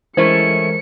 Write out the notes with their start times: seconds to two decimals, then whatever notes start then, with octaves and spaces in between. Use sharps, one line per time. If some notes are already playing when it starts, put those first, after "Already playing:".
0.17 E3 G#3 A3 C#4 E4 A#4 C5 C#7